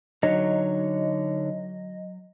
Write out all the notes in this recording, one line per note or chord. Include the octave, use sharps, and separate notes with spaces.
D3 F#3 D#4 C#5 D#5